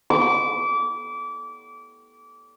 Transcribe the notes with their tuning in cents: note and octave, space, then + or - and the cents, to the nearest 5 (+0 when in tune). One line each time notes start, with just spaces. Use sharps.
D6 -25